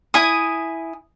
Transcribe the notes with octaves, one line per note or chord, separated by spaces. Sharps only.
E4 G#5 D#6